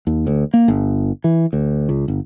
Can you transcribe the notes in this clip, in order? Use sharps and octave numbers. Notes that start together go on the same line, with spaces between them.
D#2
D2
A#3
G1
E3
D2
C#2
G1